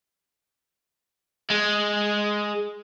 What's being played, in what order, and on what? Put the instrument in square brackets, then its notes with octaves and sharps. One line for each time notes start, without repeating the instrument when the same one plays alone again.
[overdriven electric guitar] G#3